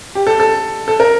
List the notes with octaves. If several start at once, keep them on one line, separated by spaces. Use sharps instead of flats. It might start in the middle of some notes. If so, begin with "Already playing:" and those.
G4
A4
A4
A4
A#4